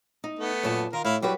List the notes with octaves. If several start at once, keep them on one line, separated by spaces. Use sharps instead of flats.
D#4
A3 B3
F#2 A#2 A5
D#3 F4 A#4
A2 E4 F5
F#3 G3 F#4 G4 B4